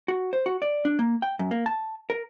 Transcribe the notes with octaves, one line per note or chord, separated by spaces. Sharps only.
F#4
C5
F#4
D5
D4
A#3
G5
F#2
A#3
A5
A#4